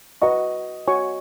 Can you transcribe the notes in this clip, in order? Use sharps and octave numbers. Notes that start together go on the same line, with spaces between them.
F#4 B4 D#5 F#5 A#5 C#6
F#4 C#5 G#5 C#6